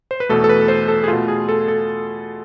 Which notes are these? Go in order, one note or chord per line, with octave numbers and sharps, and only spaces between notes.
C5
B4
E2 B2 A3 A4
A4
B4
C5
A4
G#4
B2 A3 F4
G#4
A4
A4